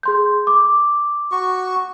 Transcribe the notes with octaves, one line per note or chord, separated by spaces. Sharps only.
G#4 C6 G6
D6
F#4 C#6